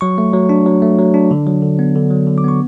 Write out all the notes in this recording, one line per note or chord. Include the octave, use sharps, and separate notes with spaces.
F#3 C#6
A3
F#3
D4
F#3
A3
F#3
D4
D3
F#3
D3
B3
D3
F#3
D3
D6
B3 C#6